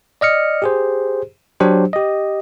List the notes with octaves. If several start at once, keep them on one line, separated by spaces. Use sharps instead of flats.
D5 D#5 F6 C#7
G4 G#4 C5
F#3 D4 G4 C5
G4 D#5